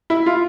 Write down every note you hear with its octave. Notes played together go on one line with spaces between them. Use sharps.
E4
F4